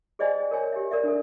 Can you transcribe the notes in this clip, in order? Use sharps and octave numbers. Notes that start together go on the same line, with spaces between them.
G#4 C5 D5 D#5 G5 G#5
A#4 C#5 G#5
G4 E5
A#4 D5 E5
D4 A4